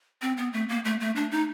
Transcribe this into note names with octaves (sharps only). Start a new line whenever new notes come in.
C4
B3
A3
A#3
A3
A3
D4
D#4